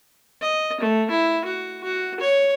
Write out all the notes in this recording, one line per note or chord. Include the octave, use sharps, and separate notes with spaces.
D#5
A3
E4
F#4
F#4
C#5